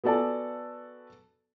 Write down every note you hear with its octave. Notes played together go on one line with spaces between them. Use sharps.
B3 F#4 A4 D5 G#5 A5